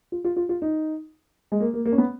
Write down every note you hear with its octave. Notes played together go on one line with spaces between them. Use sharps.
F4
F4
F4
F4
D#4
G#3
A#3
A#3
A#3
C#4
B3